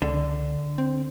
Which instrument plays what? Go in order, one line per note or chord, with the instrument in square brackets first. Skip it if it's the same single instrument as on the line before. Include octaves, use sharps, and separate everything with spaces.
[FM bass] C#2 [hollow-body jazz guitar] D3
[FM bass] C4